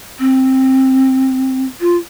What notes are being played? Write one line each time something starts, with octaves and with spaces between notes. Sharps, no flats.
C4
F4